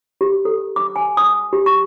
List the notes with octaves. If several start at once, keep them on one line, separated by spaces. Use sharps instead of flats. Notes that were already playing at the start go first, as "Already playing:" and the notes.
G4
A4
D6
G#5
D#6
G4
C#6